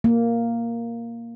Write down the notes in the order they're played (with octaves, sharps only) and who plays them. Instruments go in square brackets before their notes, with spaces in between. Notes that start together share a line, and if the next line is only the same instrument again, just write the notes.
[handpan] A#3